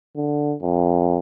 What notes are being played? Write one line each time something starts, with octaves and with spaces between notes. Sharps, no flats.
D3
F2